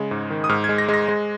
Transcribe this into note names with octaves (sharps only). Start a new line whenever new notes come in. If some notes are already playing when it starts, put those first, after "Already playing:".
Already playing: C#3 G#3
G#2
D#3
D#6
G#2 F6
G#6
G#3
A#6
G#3
A#6
G#3